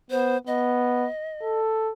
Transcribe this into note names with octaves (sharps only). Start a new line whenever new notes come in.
B3 C5
B3 D#5
A4